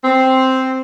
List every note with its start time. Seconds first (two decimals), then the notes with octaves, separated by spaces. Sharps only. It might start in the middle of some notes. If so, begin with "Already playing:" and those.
0.04 C4